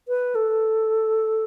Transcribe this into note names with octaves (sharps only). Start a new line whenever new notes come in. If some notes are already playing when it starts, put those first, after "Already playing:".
B4
A4